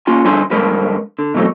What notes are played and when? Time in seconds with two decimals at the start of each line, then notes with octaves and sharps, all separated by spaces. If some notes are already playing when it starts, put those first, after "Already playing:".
0.07 A#3 C#4 F4 G#5
0.25 G2 D3 F3 D4 G#5 C6
0.51 G2 D3 F3 G#3 A#4 B4
1.19 D3
1.34 B2 E3 F#3 A3 C4